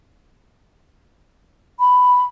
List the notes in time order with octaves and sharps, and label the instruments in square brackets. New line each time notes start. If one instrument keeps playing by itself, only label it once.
[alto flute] B5